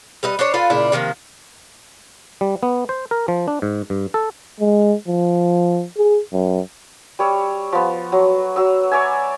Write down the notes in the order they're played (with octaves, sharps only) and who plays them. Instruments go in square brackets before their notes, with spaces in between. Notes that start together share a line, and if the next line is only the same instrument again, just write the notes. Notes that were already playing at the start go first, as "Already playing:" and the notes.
[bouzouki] G3 B4 D#5
D4 C5 C#5
F4 A4 B4 F5
A#2 C#3 D4 E4
C3 D#3 F3 A#3
[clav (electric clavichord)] G3
B3
C5
A#4
F3
D4
G#2
G2
A4
[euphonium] G#3
F3
G#4
F#2
[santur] G3 C#5 E6
F3 B3
F#3
F#3 E6
C#5 D5 E5 G#5